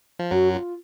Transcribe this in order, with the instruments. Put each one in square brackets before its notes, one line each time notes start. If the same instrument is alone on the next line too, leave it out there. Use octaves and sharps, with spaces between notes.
[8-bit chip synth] F3
[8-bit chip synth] F#2 F#3 [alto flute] F#4
[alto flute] F4